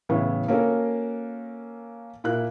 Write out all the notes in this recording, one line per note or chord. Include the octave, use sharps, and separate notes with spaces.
A2 C#3 E3 B3 E4
A#3 C#4 F#4 A4 A#4
A#2 E4 A#4 F#6